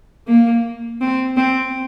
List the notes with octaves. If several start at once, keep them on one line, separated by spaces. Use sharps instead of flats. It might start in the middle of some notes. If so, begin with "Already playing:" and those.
A#3
C4
C4